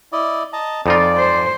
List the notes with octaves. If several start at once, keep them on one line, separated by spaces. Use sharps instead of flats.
E4 D5 D#5
D#5 A5 A#5
F2 D#4 F4 D5 G#5
C5